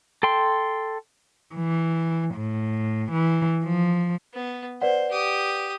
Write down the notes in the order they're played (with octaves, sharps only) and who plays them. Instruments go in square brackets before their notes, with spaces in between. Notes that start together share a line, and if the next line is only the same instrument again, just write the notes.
[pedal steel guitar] A4 G5 C6
[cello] E3
A2
E3
F3
[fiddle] B3
[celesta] B4 D5 F#5 [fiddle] C5
[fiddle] G4 D#6